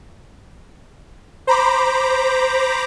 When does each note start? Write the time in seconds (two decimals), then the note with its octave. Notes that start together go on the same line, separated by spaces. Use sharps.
1.47 C5 A#5 B5 D6